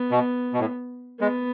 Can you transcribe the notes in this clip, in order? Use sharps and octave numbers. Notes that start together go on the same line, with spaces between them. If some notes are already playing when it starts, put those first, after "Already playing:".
Already playing: B3
B2
B2
A2
G#3 B3